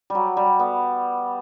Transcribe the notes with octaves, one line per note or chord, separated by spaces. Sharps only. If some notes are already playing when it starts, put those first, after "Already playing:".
F#3 G3
G3
B3